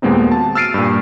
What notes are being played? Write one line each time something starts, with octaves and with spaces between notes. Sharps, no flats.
D#2 A#2 G#3 B3 C4 D#4
F#4 A5
E6 F6 A6 C7 D7 D#7
G2 A#2